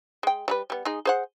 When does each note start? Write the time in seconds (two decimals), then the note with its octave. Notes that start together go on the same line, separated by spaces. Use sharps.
0.23 G#3 G5
0.48 G3 G#4 B4
0.70 G3 B3
0.85 G#3 D#4 G#4
1.05 G#4 C5 F#5